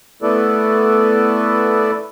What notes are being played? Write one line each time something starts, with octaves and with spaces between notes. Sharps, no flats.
A3 B3 E4 A4 B4 D5